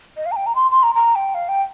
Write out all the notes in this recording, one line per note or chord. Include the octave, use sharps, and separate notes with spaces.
D#5
F5
A#5
G5
A#5
C6
C6
A#5
A#5
G5
F5
G5